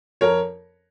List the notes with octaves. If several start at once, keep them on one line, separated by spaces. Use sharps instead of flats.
F2 A#4 C#5